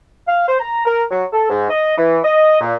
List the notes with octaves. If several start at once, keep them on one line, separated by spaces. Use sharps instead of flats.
F5
C5
A#5
A#4
F#3
A4
G#2
D#5
E3
D#5
A#2